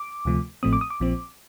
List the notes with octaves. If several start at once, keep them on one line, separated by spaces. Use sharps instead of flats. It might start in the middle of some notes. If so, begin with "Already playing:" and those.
Already playing: D6
D2 C3 F3 A3
A1 A2 F3 A3 C4 D#6
D6
D#6
D6
A#1 A#2 F3 C4